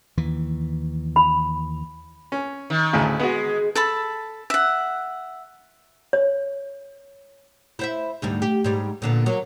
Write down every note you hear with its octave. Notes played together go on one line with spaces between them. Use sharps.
D#2 E3
B5
C#4
D#3
D2 A2 C#3
G#3 B3 F#4
A4 A5 B5
E5 F#5
C#5
E4 C5 E5
D2 G#2 G3
G4
G#2 G3
A#2 D3 B3
F#3 A#3